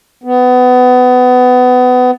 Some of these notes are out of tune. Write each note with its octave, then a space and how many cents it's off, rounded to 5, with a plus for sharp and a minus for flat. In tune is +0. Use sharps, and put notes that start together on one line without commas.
B3 +25